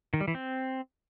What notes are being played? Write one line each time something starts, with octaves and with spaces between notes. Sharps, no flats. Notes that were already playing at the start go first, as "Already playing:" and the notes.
D#3
G3
E3
C4